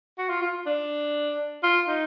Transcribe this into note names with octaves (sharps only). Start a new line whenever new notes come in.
F#4
F4
F4
D4
F4
D#4